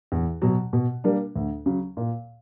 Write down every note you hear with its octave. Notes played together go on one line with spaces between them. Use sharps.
E2
B2 F#3
B2
G3 A#3 D4
D2
C#3 F#3
A#2